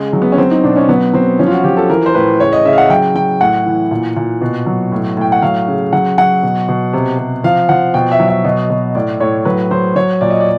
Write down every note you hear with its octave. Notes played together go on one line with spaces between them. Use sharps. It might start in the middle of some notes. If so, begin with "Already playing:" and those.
Already playing: C#3 G#3
F#3
B3
C#4
F#3 C4
D#4
B2 D4
C#4
F#3 B3
F#3 C4
F3 C#4
F4
F#4
F3 G4
A4
E3 A#4
C5
A2 B4
C#3 C#5
D#5
C#3 E5
F5
F#5
F#3 G5
F#3 G5
A2 F#5
E3
A#2
A#2
B2
F#3
A2
A2 G5
F#5
F#3 F5
C#3
F#3 F#5
F#3 F#5
B2
B2
C3
C3
F3 F5
F3 F#5
B2 G5
E5
F#3
E5
B2 D#5
B2
A2 D5
A2 C#5
F#3 B4
F#3 C5
F#3 C#5
A#2 D5
D#5
D5